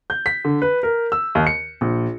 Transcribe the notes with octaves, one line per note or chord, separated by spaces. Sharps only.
G6
B6
D3
B4
A#4
E6
D#2
C#7
A#1